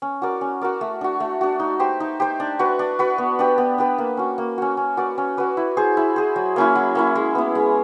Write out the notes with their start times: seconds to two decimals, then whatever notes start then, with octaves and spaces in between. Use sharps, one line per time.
0.02 C#4
0.22 F#4 A#4 D5
0.41 C#4
0.61 F#4 A#4 D5
0.81 A3
1.01 D4 F#4
1.20 A3
1.41 D4 F#4
1.60 D#4
1.80 G4 C5
2.00 D#4
2.20 G4 C5
2.40 D4
2.59 F#4 B4
2.79 D4
2.99 F#4 B4
3.18 B3
3.39 D4 G4 B4
3.58 B3
3.78 D4 G4 B4
3.98 A#3
4.17 C#4 F#4
4.38 A#3
4.58 C#4 F#4
4.77 C#4
4.97 F#4 B4 D5
5.18 C#4
5.37 F#4 B4 D5
5.57 E4
5.77 G#4 C5
5.97 E4
6.16 G#4 C5
6.36 F#3
6.56 A#3 C#4 E4
6.75 F#3
6.95 A#3 C#4 E4
7.15 G#3
7.35 B3 E4
7.55 G#3